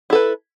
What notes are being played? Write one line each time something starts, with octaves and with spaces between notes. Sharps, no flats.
E4 A4 B4